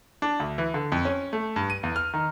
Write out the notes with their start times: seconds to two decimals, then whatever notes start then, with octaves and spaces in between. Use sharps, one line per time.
0.22 D4
0.40 D2
0.58 E3
0.74 D3
0.92 F2
1.05 C#4
1.33 A3
1.56 G2
1.70 D#7
1.83 E2
1.96 F6
2.14 D#3